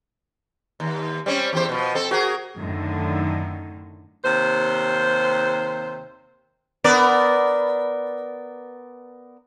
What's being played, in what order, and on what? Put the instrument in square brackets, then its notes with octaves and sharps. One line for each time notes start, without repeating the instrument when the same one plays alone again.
[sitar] D#2
G3 C4 C#4
E2 G4 C5
B2 F3
C4 A4
F#4 G#4 A#4
[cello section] F#2 A2 D3 D#3
[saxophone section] D#2 C3 C5
[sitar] B3 A#4 D5